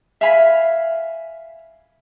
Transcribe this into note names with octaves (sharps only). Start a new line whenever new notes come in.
E5 F5 G#5 B5